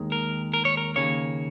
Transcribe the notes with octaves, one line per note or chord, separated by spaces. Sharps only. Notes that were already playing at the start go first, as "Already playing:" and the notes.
Already playing: D#2 D#3 G#3
A#4
A#4
C#5
A#4
D#2 C#3 A#3 C#5